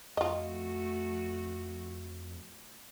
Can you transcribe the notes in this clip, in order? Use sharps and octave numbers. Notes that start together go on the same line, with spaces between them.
F2 A3 F4 F#4 D#5